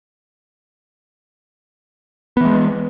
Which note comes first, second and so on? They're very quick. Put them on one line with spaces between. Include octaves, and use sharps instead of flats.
B3 E3 G#3